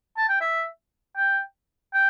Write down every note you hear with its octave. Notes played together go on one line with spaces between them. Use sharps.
A5
G5
E5
G5
G5